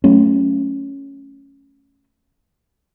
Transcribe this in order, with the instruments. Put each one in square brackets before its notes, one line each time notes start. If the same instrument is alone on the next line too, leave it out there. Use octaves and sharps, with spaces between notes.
[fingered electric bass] F#3 A3 C#4